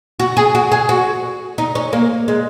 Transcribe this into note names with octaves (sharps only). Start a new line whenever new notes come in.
F#4
G#4
F#4
G#4
F#4
D#4
C#4
A#3
G#3